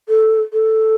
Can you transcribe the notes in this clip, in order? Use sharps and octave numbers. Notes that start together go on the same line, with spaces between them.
A4
A4